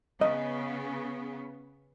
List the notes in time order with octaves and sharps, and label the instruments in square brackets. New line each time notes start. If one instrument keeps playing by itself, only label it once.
[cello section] C#3 B3 [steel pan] D#5